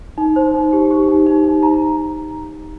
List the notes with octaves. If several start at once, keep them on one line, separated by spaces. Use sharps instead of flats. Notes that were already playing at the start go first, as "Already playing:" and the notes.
D#4
C5
D#4
G4
G4
D#4
D#4
D#4
A#5